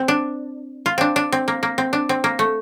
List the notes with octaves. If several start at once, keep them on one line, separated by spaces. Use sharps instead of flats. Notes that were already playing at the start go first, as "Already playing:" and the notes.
Already playing: C4
D4
F4
C4 D4
D4
C4
A#3
A#3
C4
D4
C4
A#3
A3